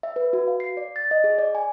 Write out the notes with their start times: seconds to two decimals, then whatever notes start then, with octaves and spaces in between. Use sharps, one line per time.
0.03 E5
0.16 B4
0.33 F#4
0.48 F5
0.60 C7
0.77 D5
0.96 A6
1.11 D#5
1.24 G#4
1.38 D5
1.55 G#5